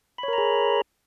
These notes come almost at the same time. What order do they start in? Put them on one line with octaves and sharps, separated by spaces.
B5 C#5 A#4 A#5 G#4